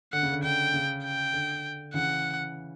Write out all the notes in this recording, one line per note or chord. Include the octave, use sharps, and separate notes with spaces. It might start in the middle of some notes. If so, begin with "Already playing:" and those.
D3 F#5
C#3
D3
D3 G5
C#3
G5
D3
C#3 E3 F#5